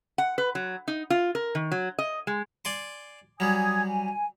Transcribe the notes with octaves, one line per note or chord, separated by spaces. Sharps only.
F#5
B4
F#3
D#4
F4
A#4
D#3
F#3
D#5
G#3
D5 G#5 C6
F#3 G3 G#5 D#6 G#6
G#5